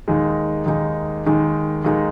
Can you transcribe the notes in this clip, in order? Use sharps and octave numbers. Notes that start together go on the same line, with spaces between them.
D#2 D#3 G#3 D#4
D#2 D#3 G#3 D#4
D#2 D#3 G#3 D#4
D#2 D#3 G#3 D#4